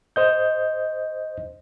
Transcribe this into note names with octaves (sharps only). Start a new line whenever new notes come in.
C5 D#5 G6